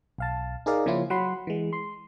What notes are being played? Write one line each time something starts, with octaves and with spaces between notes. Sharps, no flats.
B1 F5 A5
D#4 G#4 A#4 D5 F5
C#3 F3 A#3 C#4 E4 F4
F#3 F#5 B5 C6
E3 G#3
C6